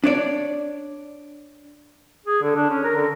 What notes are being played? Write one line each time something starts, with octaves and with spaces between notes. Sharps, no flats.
D4 C#5 D5
G#4
D3
D4
C#4
A#4
D3